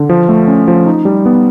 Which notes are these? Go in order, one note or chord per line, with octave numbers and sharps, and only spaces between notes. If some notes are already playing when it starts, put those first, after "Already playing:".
Already playing: D3
F3
A3
C#4
F3
D#4
G3
B3